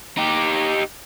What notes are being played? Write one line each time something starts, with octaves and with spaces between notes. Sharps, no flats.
D#4 G4